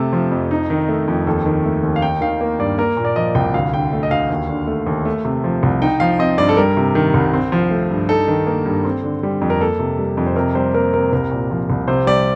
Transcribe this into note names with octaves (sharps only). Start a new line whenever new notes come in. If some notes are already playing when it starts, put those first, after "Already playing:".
Already playing: C3 A3 A4
F3
F2
D#4
D#3
A3
F2
D#2 A4
D#3
A3
D#2
F5
D#4 G5
D#3 F5
A#3
G2 D5
A#3 A#4
A#2
D5
F3 D#5
C2 G5
D2 F5
D3 G5
A3
D#5
D2 F5
D#2
D3
A3
D#2
A3
C3
F3
C2
D#4 G5
F3 F5
C4 D#5
G2 D5
A4
G3 A#4
C3
D#3
C2
C4
F3
A3
G2
D#4 A4
D#3
A#3
G2
C4
D3
G3
F2
A#4
A#3 A4
C3
G3
F2
C5
C3 A#4
G3 C5
A#3 A#4
C3 A#4
C2 A#4
A#2
F3
C2
C3 C5
G3 D5